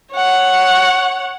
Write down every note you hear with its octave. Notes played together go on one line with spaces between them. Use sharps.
C#5 F#5